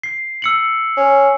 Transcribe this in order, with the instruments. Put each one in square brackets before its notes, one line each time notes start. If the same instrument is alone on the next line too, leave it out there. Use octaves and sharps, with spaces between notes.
[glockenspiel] C7
E6 C#7 F#7
[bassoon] C#4